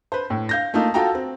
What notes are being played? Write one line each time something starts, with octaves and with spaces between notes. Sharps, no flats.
B4 C5
A2
F5 G6 A#6
A3 A#3 D#4 F4
F4 F#4 A4 G5 A#5
C4